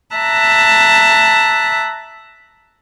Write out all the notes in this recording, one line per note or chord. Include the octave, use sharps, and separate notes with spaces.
E5 A5 A#5 F#6